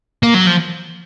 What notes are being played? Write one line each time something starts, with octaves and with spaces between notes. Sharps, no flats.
A#3
F#3
F3